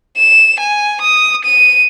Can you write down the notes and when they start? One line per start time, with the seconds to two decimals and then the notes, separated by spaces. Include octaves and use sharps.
0.17 E7
0.60 G#5
1.01 D#6
1.45 D#7